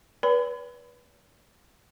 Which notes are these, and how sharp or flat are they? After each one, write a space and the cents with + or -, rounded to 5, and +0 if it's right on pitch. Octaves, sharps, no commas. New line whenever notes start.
B4 -25 D5 -45 B5 +35